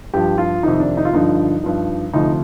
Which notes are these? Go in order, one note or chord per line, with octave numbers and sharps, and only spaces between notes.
G2 F3 G4
F4
F2 C3 D#3 D#4
D4
D#4
F4
G2 D3 F3 D#4
G2 F3
D2 C3 F3 D#4